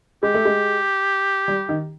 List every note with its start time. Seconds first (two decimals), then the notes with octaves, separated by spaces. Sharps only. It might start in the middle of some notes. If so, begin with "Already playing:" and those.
0.23 G#3 G4
0.34 A3
0.45 G#3
1.48 G3
1.69 D#3